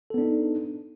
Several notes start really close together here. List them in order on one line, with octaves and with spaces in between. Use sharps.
A4 B3 D4 D#4